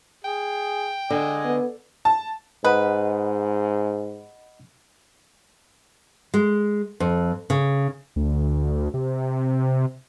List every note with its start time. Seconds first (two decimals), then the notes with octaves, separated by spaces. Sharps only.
0.24 G#4 G5
1.10 D3 D#5 G#5
1.45 B3
2.05 A5
2.64 G#2 B4 D#5 F#5 B5
6.34 G#3
7.00 F2
7.50 C#3
8.16 D2
8.94 C3